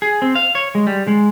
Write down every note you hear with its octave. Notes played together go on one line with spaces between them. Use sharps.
G#4
C4
F5
C#5
G#3
G3
G#3